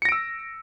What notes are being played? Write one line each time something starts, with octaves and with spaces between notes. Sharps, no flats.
E6 A#6 C#7 D7